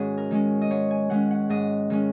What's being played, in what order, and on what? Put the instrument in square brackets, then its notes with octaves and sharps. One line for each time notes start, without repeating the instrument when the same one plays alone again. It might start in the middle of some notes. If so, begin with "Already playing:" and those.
Already playing: [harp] G#2 D#3 C#4 F#4 G#4 C#5 D#5
A#4
D#3 G#3 C#4
D#5
G#2 C#5
G#5
D#3 G#3 C#4 F#5
F#5
G#2 D#5
D#3 G#3 C#4